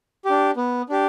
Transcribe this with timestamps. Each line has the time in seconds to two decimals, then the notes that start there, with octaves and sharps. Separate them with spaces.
0.25 D4 G4
0.57 B3
0.89 D4 G4